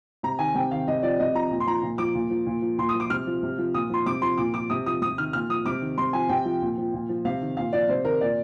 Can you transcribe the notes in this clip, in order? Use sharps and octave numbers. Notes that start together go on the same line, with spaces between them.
C3 A#5
D#3 G#5
C3 G5
D#3 F5
C3 D#5
F3 D5
C3 D#5
F3 A#5
A#2
C6
F3 A#5
A#2
F3 D6
A#2
F3
A#2
F3
A#2 C6
D#6
F3
D6
C3 F6
F3
C3
F3
A#2 D#6
F3 C6
C3 D6
F3 C6
A#2 D6
F3 D6
C3 D#6
F3 D#6
C3 D#6
D#3 F6
A#2 F6
F3 D#6
C3 D6
D#3
C3 C6
F3 G#5
C3 G5
F3
A#2
F3
A#2
F3
C3 F5
D#3
A#2 F5
F3 D5
C3 C5
D#3 A#4
A#2 D5